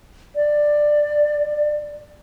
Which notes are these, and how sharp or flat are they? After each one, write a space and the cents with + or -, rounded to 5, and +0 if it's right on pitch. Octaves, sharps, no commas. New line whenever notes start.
D5 +10